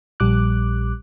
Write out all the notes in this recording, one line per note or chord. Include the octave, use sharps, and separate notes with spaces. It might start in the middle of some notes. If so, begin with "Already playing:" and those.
A#1 G3 D6 F#6